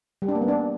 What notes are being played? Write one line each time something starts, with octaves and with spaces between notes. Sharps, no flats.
G3
D4
A#3
B3
D4